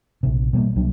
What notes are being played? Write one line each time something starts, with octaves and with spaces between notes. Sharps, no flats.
A#1 C3
B2 G3 G#3 A#3
C2 F#3 D4